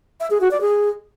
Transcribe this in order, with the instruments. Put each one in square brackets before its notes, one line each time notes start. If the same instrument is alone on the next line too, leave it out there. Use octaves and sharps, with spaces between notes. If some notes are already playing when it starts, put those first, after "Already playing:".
[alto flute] E5
G#4
F#4
D5
G#4